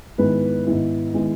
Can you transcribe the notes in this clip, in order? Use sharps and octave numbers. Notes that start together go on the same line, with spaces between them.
G#2 D#3 G#3 B3 E4 B4
G#2 D#3 G#3 B3 E4
D#3 G#3 B3 E4